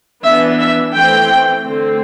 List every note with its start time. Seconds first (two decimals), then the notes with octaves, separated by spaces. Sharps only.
0.23 E3 B3 D4 E5
0.59 E5
0.95 E3 A3 C4 G5
1.64 D3 A3 C4